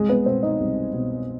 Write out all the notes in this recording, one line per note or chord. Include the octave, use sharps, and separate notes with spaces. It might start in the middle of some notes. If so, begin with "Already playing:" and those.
Already playing: C2 G#3 G#4
B3 B4
B2 C4 C5
D#4 D#5
C2
B2